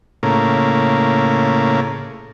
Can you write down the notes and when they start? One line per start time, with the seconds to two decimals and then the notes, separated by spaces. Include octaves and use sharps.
0.23 A2 C#3 A#3